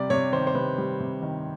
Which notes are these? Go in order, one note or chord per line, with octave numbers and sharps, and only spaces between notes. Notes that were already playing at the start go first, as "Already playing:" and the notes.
Already playing: C3 G3 D5
C3 C#5
D#3 C5
C5
C3 B4
G3
C3
D#3